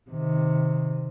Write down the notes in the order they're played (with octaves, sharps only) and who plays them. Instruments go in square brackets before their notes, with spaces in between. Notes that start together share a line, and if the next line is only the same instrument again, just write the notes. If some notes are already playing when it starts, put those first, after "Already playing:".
[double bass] C3 D#3